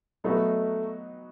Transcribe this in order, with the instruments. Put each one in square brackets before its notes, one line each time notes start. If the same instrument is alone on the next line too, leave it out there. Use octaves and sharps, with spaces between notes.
[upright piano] F#3 B3 D#4 F#4 B4 [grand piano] A3